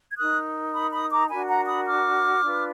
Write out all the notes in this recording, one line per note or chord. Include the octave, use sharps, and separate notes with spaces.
G#6
D#4 A#4 D#6 F#6
B5 D#6
B5 D#6
A#5 D6
D4 F#4 A#4 G#5 B5
F#5 A#5
B5 D#6
D6 F6
D4 F4 B4